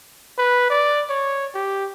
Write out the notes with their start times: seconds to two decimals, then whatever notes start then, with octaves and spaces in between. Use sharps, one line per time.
0.38 B4
0.70 D5
1.09 C#5
1.55 G4